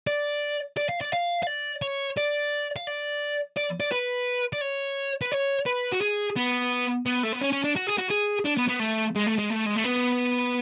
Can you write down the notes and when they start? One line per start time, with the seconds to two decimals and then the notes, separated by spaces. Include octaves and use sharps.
0.07 D5
0.77 D5
0.89 F5
1.01 D5
1.13 F5
1.43 F5
1.47 D5
1.82 C#5
2.18 D5
2.76 F5
2.87 D5
3.57 D5
3.80 D5
3.92 B4
4.53 D5
4.61 C#5
5.21 B4
5.32 C#5
5.66 B4
5.92 F#4
6.01 G#4
6.36 B3
7.06 B3
7.23 A3
7.32 B3
7.41 C#4
7.52 C#4
7.64 D4
7.76 F#4
7.87 G#4
7.98 F#4
8.10 G#4
8.45 D4
8.57 B3
8.69 B3
8.80 A3
9.16 G#3
9.27 A3
9.39 G#3
9.50 A3
9.66 G#3
9.76 A3
9.85 B3